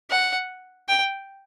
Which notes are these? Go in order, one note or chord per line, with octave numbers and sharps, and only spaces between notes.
F#5
G5